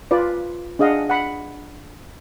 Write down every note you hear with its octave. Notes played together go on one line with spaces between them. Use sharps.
F4 B4 D5
D4 G#4 D#5 F5 F#5
F#5 B5